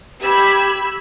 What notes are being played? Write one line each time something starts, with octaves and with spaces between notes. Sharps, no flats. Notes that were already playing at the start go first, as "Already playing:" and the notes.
G4 B5 E6 G#6